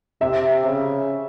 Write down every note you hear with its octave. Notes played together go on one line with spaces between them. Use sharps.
C3 E5
C#3